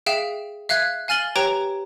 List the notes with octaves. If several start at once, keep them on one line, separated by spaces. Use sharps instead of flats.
G#4 E5 F5 G5 E7
E5 F5 F#6 G#6
F5 G#5 F6 A6 F#7 G7
G4 B4 C#5 G5 A#5 D7